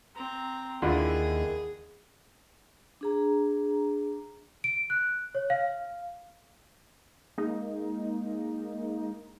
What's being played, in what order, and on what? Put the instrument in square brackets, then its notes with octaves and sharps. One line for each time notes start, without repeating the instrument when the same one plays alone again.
[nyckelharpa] C4 A#5
[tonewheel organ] D#2 D#3 [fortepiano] D3 E4 F4 [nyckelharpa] G#4
[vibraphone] D4 G#4 A#5
[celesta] D7
F#6
C#5
F5
[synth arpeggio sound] G#3 A#3 D#4